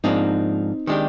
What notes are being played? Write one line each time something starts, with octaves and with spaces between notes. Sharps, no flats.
G#2 F3 A#3 C4 D4 D#4
D#3 G#3 D4 G4